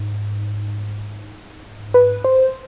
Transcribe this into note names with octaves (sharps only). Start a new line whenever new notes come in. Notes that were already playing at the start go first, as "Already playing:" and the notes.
Already playing: G#2
B4
C5